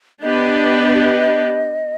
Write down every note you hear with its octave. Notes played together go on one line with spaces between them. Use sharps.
B3 D4 G4 B4 D#5